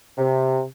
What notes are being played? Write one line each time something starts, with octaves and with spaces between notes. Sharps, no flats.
C3